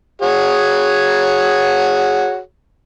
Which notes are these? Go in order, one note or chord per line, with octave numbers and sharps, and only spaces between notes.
F#4 G#4 C#5